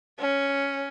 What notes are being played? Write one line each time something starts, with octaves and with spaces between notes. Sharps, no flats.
C#4